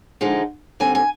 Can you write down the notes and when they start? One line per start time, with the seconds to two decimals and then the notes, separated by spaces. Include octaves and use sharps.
0.21 D3 F3 G#3 D#4
0.80 D#2 D3 G3 C4 G#5
0.95 G#5